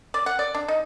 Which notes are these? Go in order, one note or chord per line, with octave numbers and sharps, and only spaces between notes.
D5
F#5
D5
D4
D#4